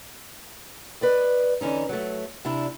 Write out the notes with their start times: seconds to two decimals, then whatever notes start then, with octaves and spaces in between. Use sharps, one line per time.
1.01 B4 D5 D#5
1.61 D3 E3 C#4 D#4
1.89 F#3 A3
2.45 C3 D4 E4